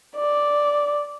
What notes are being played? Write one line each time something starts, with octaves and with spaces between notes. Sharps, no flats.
D5